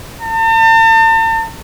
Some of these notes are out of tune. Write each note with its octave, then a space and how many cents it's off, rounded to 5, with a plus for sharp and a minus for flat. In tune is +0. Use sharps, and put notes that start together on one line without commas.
A5 +40